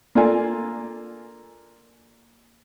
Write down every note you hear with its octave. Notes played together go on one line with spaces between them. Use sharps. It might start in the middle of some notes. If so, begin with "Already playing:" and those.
A#3 D4 F4 A4 D5 G#5